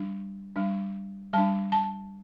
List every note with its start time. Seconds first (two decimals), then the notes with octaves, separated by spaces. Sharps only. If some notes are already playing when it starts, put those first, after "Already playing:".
Already playing: G3 D4
0.56 G3 D4
1.33 G3 D4 A5
1.72 A5